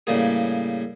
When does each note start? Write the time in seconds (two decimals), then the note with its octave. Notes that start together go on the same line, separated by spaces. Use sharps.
0.07 A2 C#3 G3 A#3 G#4